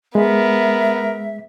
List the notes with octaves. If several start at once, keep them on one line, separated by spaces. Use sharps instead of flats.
G#3 B3 A#4 E5